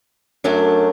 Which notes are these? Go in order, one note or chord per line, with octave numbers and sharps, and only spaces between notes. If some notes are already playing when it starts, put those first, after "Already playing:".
F#2 F#3 A3 D4